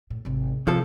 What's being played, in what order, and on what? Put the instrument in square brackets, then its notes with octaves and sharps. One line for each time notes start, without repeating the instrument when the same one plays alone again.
[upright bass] A2
G#1 C3
[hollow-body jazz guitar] F2 F3 A4 [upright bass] C3